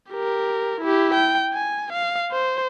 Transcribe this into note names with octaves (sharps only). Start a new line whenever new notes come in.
G4 A#4
E4 G4
G5
G#5
F5
C5